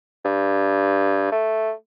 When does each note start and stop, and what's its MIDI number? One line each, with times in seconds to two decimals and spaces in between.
0.25 1.31 43
1.32 1.72 57